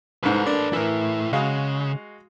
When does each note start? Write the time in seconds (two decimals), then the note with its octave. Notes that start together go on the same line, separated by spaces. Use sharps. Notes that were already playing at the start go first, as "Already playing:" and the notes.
0.23 C2 G#2 A4 B4
0.46 A#3 D4
0.73 A2 E3 E4 A#4
1.33 C#3 G#3 F#4 F5